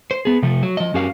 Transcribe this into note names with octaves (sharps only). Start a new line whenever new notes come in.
C5
B3 G#4
C3 F3 A3
F#3
F3 D#5
F#2 C#4 F#4 G4 A#4 F5